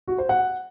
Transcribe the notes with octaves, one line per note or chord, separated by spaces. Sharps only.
F#4
C5
F#5